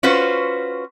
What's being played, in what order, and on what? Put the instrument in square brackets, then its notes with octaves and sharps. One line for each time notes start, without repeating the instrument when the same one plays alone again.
[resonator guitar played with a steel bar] C#4 F4 F#4 B4 C5